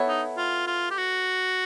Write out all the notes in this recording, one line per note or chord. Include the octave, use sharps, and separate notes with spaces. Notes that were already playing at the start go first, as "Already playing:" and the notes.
Already playing: B3 E4 A4 C#5
D#4
F4
F4
G4
F#4